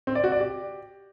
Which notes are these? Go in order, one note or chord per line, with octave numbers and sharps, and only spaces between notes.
C4
D5
F#4
D5
G4